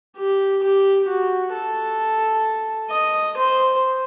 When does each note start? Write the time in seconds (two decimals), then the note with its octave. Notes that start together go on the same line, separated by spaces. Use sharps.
0.17 G4
0.63 G4
1.08 F#4
1.54 A4
2.91 D#5
3.37 C5